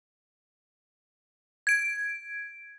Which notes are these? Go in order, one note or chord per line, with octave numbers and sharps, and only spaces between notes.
G#6 D7